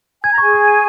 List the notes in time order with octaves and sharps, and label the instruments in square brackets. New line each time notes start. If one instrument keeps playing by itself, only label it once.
[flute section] G#5 [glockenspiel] G#6
[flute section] A#5
[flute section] G#4 G#5 [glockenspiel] C#6
[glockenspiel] C#6
D#7